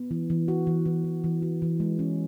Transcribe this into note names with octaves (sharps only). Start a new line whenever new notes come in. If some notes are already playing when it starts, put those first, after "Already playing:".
Already playing: B3
E3
E3
F#4
E3
E3
E3
E3
F#4
E3
G#3
C#4